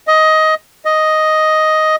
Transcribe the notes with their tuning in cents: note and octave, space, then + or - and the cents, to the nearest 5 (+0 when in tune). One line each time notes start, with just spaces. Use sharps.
D#5 +15
D#5 +5